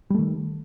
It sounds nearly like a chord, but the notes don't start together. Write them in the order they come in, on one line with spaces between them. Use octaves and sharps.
G3 A3 D#3